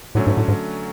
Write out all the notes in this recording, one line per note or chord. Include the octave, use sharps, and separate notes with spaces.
A2 D3 F#3 A3 C#4
G#2
A2
G#2